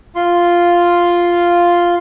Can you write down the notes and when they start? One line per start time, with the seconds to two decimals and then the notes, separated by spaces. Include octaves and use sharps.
0.16 F4 C6